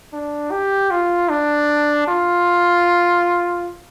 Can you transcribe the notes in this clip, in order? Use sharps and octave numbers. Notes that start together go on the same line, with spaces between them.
D4
G4
F4
D4
F4